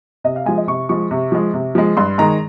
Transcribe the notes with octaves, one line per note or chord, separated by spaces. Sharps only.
C3 D#5
F5
F3 G#3 G#5
D#5
C3 C#6
F3 G#3 C#6
C3
F3 G#3
C3
F3 G#3
G2 C6
D#3 G#3 A#5